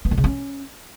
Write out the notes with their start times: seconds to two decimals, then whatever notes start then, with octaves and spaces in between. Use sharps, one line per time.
0.05 B3
0.11 D#3
0.18 C#3
0.24 C#4